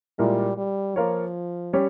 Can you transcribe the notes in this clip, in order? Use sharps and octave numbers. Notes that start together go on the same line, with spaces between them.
A#2 G3 G#3 E4 A#4
G3
F3 A#3 F4 A#4 C#5
G3 C#4 G4 C#5